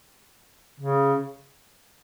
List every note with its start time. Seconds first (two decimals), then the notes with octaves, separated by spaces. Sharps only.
0.80 C#3